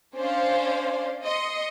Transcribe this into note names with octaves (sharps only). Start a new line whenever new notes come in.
C#4 D4 C5 D5 F5 C6
D#5 C6 C#7